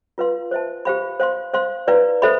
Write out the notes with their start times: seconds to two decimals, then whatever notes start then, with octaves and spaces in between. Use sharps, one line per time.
0.18 F4 B4 F5 C6
0.51 C5 E5 A5
0.85 G4 C5 F5 B5
1.20 C5 F5 C6
1.54 C5 F5 C6
1.87 E4 B4 D5 F5
2.22 A4 C5 E5 B5